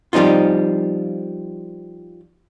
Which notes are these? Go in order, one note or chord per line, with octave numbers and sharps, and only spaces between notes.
F3 G3 C4 D#4 F4